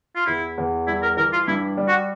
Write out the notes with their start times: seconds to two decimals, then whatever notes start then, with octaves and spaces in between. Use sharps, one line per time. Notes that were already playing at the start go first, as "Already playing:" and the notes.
0.16 F4
0.26 E2 E4
0.58 E2
0.87 G3 E4
1.03 A#4
1.17 E3 A#4
1.33 F4
1.48 G2 E4
1.77 G3
1.88 F#4